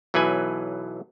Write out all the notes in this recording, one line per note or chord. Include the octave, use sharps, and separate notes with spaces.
B1 E3 F#3 B4 G#5